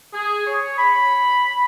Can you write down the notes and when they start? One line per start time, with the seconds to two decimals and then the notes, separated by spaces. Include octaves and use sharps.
0.13 G#4
0.47 C#5
0.78 B5